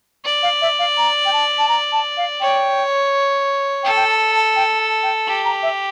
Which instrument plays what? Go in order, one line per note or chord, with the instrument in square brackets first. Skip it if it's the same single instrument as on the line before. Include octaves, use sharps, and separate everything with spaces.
[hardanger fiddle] D5
[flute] F5
E5
F5
A#5
G5
A5
A5
A#5
A5
F5
[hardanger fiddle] C#5 [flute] G5
[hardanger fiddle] A4 [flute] G5
[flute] G5
A5
A5
G5
A5
G5
[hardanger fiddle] G4 [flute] A5
[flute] A#5
E5